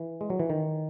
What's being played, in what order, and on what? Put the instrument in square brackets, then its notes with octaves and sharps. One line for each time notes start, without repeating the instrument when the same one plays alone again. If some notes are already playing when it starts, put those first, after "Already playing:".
Already playing: [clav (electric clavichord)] E3
G#3
F#3
E3
D#3